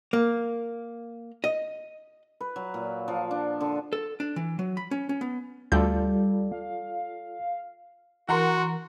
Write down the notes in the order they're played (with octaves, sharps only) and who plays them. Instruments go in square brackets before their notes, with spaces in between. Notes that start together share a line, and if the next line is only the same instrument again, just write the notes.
[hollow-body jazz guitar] A#3
D#5
[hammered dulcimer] B4
F#3
A#2
F3
D4
D3
[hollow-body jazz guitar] A4
D4
E3
F#3
B5
C#4
C#4
B3
[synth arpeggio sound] D2 G6 [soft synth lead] G3 [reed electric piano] F4 A4 D5
[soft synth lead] F5
[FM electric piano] E3 A#4 [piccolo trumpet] F#4 [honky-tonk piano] F#5 A#5 C6